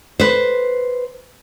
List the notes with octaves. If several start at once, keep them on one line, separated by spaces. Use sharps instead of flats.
B4 C5